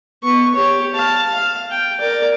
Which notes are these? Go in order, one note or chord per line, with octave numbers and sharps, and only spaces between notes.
B3 C#6
G4 C#5
F5 A5
F5
G5
A#4 D5